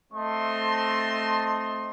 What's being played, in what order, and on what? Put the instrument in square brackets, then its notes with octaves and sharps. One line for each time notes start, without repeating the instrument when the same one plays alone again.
[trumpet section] A3 C4 D#5 A5 C6